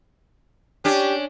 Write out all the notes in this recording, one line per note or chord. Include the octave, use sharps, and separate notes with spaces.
C#4 D4 G4